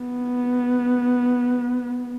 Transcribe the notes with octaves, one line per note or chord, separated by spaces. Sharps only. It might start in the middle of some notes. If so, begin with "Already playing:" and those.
Already playing: B3